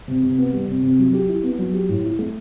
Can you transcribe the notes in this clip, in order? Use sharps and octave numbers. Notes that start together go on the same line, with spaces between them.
C3
C3
B3
G3
C3
C3
F#3
G4
E4
B3
F#3
G4
A2
E4
A3